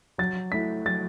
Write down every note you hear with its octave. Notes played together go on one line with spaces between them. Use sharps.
F#3 A6
A3 E4 B6
F#3 A6